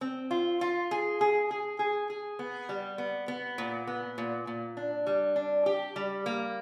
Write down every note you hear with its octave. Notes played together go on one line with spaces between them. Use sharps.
C4
F4
F4
G#4
G#4
G#4
G#4
G#4
B3
G3
B3
B3
A#2
B3
A#2
A#2
D4
G3
D4
G4
G3
A#3